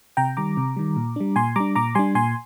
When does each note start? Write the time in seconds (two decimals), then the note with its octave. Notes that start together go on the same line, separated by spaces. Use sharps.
0.17 C3 G5 A#5
0.37 D#3 G3 A#5 D6
0.57 C3
0.76 D#3 G3
0.97 A#2
1.16 G3 D4
1.36 A#2 G#5 C6
1.56 G3 D4 A#5 D6
1.75 A#2 A#5 D6
1.95 G3 D4 G#5 C6
2.15 A#2 G#5 C6